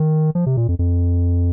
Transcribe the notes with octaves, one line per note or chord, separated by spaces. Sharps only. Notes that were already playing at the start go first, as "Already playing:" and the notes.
Already playing: D#3
F3
C3
A#2
F2
F2